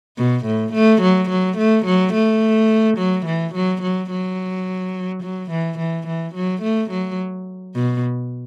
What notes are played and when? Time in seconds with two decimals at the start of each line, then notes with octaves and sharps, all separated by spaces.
0.18 B2
0.46 A2
0.74 A3
1.02 F#3
1.30 F#3
1.58 A3
1.86 F#3
2.14 A3
2.98 F#3
3.26 E3
3.55 F#3
3.82 F#3
4.11 F#3
5.23 F#3
5.51 E3
5.79 E3
6.07 E3
6.35 F#3
6.62 A3
6.91 F#3
7.75 B2